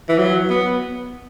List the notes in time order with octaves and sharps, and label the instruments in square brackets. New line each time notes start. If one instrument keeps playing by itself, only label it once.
[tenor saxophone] E3
F#3
B3